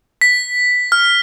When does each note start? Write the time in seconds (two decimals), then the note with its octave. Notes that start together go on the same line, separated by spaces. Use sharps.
0.21 B6
0.92 F6